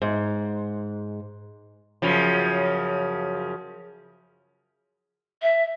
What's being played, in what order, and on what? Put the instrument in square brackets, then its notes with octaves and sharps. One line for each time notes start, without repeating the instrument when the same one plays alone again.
[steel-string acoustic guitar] G#2
[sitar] F#2 C#3 F3
[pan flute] E5